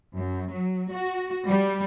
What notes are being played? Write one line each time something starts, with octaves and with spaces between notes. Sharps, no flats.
F#2
F#3
F#4
G3